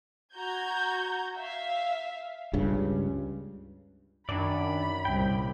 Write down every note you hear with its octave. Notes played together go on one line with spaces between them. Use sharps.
F#4 A#5 G6 G#6
E5 F5
C#2 G2 C#3
F#2 D#3 D4 D5 B5
C2 A#2 G5